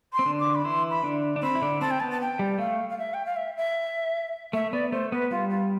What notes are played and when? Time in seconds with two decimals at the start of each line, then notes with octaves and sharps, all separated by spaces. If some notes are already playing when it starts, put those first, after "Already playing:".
0.13 C6
0.19 C4
0.26 D3 D4
0.39 D6
0.55 B5
0.65 E3 E4 C6
0.90 B5
1.04 D3 D4
1.36 D4
1.42 C4 B5
1.55 E4
1.62 D3 D4
1.81 C4 A5
1.90 G5
2.00 B3 A5
2.11 A5
2.21 G5
2.39 G3
2.58 A3 F5
2.89 F5
2.98 E5
3.13 G5
3.26 F5
3.36 E5
3.57 E5
4.53 A3 E5
4.72 B3 D5
4.92 A3 C5
5.12 B3 B4
5.31 G3 F4
5.50 F4